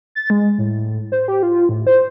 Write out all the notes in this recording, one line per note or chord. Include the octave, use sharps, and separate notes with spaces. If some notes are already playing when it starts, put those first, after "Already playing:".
A6
G#3
A2
C5
G4
F4
A2
C5